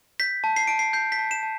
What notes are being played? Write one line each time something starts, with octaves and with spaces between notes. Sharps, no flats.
G6 B6
A5
C7
A5 D7
C7
G6 C7
B6
A5
E7
A5